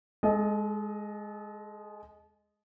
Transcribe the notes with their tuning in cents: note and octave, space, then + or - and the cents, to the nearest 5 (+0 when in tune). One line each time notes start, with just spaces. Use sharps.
G#3 +0 A4 -35 D#5 +0